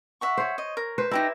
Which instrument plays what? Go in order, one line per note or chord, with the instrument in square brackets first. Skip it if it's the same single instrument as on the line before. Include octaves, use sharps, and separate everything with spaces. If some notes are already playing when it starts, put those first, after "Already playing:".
[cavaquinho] E5 F#5 C#6
[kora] C5 C#5
[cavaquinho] D#5
A#4
[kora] B4 C5
[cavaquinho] D#4 G4 A#5 [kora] E4